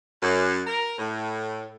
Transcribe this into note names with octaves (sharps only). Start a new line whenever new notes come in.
F#2
A#4
A2